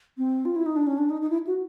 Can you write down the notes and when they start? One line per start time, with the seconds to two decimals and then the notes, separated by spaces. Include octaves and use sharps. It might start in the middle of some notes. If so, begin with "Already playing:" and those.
0.18 C4
0.45 F4
0.56 E4
0.66 D#4
0.76 D4
0.87 C#4
0.98 D4
1.10 D#4
1.21 D#4
1.30 E4
1.47 F#4